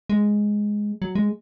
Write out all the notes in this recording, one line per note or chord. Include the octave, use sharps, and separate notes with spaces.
G#3
F#3
G#3